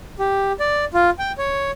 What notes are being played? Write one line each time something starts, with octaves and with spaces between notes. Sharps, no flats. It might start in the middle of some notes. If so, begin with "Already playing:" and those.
G4
D5
F4
G5
C#5